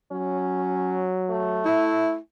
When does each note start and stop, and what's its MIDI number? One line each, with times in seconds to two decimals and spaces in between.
0.12 1.69 54
0.12 1.09 61
1.30 2.17 57
1.65 2.18 64